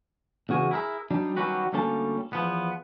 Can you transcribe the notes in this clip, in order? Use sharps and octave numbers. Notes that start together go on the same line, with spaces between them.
E2 C#3 F#4 G#5
E4 G#4 A#4 B4 E5
F#3 G3 D4 D#4
D#3 F#3 G3 C#4 F#4 B4
D2 G3 A#3 C#4 A4 A5
E2 F3 B3